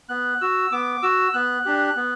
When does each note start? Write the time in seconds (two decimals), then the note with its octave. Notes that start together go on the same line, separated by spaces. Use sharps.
0.09 B3 F#6
0.41 F#4 E6
0.71 B3 D6
1.03 F#4 E6
1.34 B3 F#6
1.65 D4 G4
1.96 B3